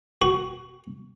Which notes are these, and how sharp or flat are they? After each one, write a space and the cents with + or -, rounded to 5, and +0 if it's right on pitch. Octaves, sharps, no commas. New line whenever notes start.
F#4 +15